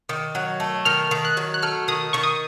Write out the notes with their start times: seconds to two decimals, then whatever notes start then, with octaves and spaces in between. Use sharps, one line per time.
0.09 D#3
0.35 F#3
0.60 A3
0.85 D#3 F6
1.11 D#3
1.25 F#6
1.37 F#3
1.54 F#6
1.62 A3 F6
1.88 D#3 D#6
2.13 D#3 C#6
2.23 D#6